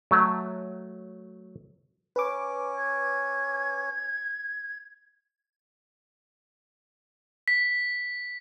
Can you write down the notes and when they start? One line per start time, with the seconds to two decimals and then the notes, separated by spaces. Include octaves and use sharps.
0.11 F#3 A3
2.16 C#4 B4 D6
2.76 G#6
7.48 B6